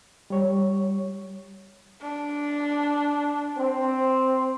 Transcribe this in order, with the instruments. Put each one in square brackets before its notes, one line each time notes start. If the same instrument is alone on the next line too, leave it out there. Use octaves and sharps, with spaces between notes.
[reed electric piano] G3 C#5
[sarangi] D4
[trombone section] C4